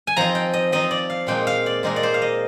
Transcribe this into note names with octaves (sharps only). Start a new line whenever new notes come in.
G#5
F3 C4 D#4 A#5
G5
D#5
F3 C4 D#4 D#5
D5
F5
A#2 G#3 C4 D#4 G5
F5
D5
A#2 G#3 C4 D#4 A#4
D5
C5
F5
D#5